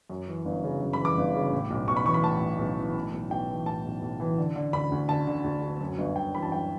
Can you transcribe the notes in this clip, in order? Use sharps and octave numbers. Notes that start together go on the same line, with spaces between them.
F#2
E3
G1
C#3
F#2
B5
E3
D6
G1
C#3
A2
B1
B1 C#6
B5
E3 C#6
B5
A2 A5
B1
B1
E3
A2
B1
B1 G5
E3
A2 A5
B1
B1
E3
D3
D3
D2 B5
D2
D3 A5
D3
D2
D2
F#2
G1
G1 G5
E3 B5
A5
F#2 G5